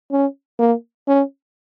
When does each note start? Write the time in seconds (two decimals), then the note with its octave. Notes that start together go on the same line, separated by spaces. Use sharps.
0.11 C#4
0.59 A#3
1.07 C#4